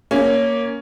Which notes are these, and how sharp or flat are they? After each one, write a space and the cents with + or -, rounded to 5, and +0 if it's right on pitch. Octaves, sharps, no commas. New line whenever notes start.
A#3 +0 C#4 +5